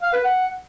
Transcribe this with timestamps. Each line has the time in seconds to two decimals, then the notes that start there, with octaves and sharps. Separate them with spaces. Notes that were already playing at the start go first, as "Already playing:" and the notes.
0.02 F5
0.13 B4
0.24 F#5